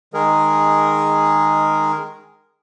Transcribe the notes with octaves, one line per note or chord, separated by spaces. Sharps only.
D#3 G#3 G#4 A#4